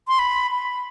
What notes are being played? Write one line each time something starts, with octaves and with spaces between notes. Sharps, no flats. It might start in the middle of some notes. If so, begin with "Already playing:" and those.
C6
B5
B5